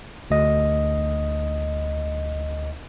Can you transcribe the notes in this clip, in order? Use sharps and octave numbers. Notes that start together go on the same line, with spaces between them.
D2 D#5